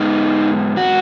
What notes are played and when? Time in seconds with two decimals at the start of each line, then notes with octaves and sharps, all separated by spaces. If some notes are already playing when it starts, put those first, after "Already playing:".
Already playing: G#2 G#3 B3 D#4
0.77 F#4